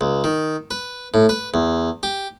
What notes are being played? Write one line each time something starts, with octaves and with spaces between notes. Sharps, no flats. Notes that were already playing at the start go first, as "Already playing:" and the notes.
C#2
D#3
B4
A2
B4
E2
G4